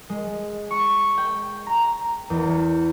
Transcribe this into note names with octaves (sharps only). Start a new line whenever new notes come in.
G#3
C#6
G5
A#5
E2